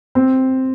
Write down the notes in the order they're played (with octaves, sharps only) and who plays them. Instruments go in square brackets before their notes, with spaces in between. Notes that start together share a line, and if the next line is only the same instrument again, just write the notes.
[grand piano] C4